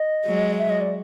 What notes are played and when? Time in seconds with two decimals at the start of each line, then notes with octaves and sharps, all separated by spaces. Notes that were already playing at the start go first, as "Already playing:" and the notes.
Already playing: D#5
0.26 F#3 G#3
0.58 E5
0.70 D#5
0.81 D5